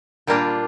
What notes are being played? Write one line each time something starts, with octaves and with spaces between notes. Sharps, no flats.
A#2 G3 A#3 D4 F4